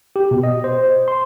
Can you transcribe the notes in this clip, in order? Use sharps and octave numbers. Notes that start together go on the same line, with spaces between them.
G4
B2
D#5
C5
C6